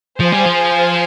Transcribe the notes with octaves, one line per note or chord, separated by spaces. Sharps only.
F3 G#4 C5 F5 G#5
G3
F3